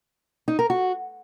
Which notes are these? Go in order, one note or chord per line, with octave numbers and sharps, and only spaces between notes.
D#4
A#4
F#4